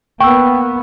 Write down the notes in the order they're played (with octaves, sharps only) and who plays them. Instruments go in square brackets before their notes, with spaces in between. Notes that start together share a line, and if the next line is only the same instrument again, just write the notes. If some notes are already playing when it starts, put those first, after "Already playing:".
[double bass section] A#3 B3 [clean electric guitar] G5 [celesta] C#6 E6